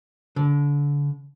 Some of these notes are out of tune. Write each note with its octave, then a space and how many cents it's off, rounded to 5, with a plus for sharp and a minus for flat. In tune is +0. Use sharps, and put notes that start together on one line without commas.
D3 -30